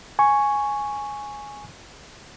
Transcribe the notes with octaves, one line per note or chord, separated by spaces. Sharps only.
G#5 C#6